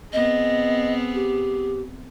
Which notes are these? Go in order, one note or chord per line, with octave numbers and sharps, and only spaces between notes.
B3 C4 G#4 D#5
G4